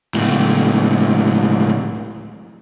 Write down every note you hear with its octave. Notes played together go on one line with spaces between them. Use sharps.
C#2 A2